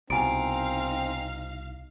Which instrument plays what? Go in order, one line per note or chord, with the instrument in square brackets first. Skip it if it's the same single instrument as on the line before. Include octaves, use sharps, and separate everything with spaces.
[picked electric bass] C2 B2 [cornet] C4 [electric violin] D#4 F5 [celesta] G#5 A#5 D7